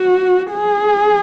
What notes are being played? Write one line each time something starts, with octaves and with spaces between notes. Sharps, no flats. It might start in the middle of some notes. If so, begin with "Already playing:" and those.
Already playing: F#4
G#4